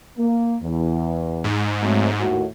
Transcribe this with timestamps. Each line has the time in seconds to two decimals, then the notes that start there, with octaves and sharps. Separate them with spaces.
0.18 A#3
0.62 E2
1.44 G#2
1.82 F#3 A3 C4
2.20 D#2 A2 F#4